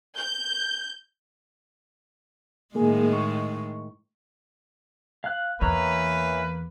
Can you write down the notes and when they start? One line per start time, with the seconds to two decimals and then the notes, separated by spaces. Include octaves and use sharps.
0.15 G6
2.75 A2 D#3 G#3 A#3 G#4
3.13 C#6
5.24 F5 F#6
5.61 E2 E3 A#3 B4 C#5 A#5